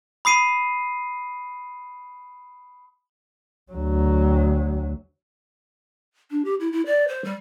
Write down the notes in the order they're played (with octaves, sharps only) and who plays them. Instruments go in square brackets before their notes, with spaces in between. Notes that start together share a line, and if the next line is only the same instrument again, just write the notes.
[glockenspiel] B5 D#6 C7 D#7
[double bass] D2 F#3
[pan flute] D4
G4
E4
E4
D5
C5
G3